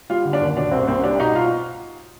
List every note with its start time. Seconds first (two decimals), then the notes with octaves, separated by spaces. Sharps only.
0.10 G3 F4
0.25 D3
0.33 D4
0.41 D#2
0.57 B2 D4
0.71 C2 C4
0.87 C2 C4
1.03 G3 D4
1.20 B2 D#4
1.35 F4